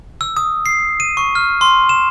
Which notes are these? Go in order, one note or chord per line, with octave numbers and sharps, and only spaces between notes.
E6
D#6
C7
D#7
C#6
F6
C6
E7